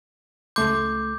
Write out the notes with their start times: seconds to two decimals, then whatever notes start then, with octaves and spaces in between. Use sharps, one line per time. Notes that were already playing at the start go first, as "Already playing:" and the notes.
0.56 C#2 A3 C6 D6 G6